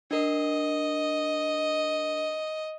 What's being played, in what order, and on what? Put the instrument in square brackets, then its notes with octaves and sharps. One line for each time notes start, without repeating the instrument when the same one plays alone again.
[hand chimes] D4 A#4 [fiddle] D#5